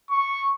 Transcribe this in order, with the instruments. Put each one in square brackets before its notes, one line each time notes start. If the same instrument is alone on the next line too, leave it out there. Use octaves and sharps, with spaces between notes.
[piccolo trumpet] C#6